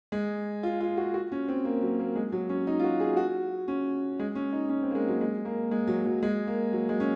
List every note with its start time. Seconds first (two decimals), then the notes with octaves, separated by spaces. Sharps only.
0.12 G#3
0.63 F4
0.81 F4
0.97 F#4
1.14 F#4
1.32 C#4
1.49 C4
1.65 A#3
1.82 F#3
1.99 A#3
2.16 G#3
2.32 F#3
2.49 C#4
2.67 D#4
2.79 F4
2.84 F#4
3.00 G#4
3.17 F#4
3.68 C#4
4.19 G#3
4.35 C#4
4.53 D#4
4.69 C#4
4.83 C4
4.91 A#3
4.95 G#3
5.08 F#3
5.21 G#3
5.45 A#3
5.71 G#3
5.87 F#3
6.06 F#3
6.22 G#3
6.47 A#3
6.73 F#3
6.89 G#3
7.00 C#4